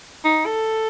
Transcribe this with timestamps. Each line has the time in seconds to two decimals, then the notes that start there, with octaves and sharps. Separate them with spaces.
0.25 D#4
0.46 A4